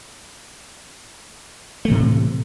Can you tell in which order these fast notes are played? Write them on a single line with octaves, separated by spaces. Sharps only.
A3 E3 A2 C3